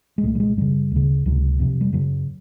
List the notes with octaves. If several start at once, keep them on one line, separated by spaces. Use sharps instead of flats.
G#3
C2 A#2 A3
G3
G#3
F#2 C#3 G3
D2 C#3
C#2 C3 F#3
F2 C3
G3
F#2 C#3 F#3